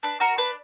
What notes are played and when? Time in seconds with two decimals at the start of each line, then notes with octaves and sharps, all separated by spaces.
0.03 D4 B4
0.20 F#4 A#4
0.38 D4 B4